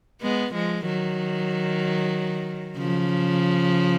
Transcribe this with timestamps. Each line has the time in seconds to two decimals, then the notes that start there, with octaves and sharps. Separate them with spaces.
0.22 G#3 B3
0.54 F3 G#3
0.86 D#3 F#3
2.77 C#3 F3